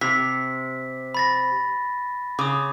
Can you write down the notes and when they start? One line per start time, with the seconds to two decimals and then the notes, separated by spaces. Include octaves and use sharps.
0.01 C3 B6
1.15 B5 A6 A#6
2.39 C#3 D6 D#6